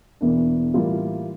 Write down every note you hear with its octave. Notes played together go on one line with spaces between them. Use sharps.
E1 E2 E3 A#3 D4
A2 E3 G3 A#3 F4